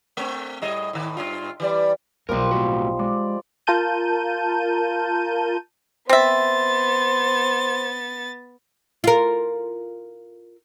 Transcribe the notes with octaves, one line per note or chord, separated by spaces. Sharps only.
A3 C4
A2 G3 D#5
A2 D#3
G2 A#2 F4
E3 G3 D5
B1 F3 G3 B3 D#4 A#4 C5
A2 F#4
G#3 D5
F4 A#4 A5 G6 D#7
B3 C4 C5 E5 A6
F4 A#4